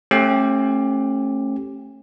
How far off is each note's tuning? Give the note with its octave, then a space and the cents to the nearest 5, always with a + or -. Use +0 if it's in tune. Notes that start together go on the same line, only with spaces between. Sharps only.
A3 +0 C#4 -35 G4 +0